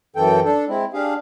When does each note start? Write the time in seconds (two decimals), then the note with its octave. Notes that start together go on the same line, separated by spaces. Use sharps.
0.16 F#2 E3 A4 G5
0.45 D4 A4
0.69 G#3 C4 E4
0.93 D4 G4 G#4 F5